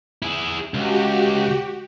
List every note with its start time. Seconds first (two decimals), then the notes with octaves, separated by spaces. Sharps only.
0.22 E4 G#4
0.74 C#2 F#4 G4